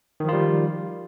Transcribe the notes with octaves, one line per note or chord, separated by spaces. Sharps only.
D#3 F3 G3 F4